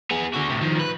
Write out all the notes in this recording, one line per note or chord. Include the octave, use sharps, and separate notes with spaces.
B3 G#4
D3 F#4
A2 C3
D#3 F3
B4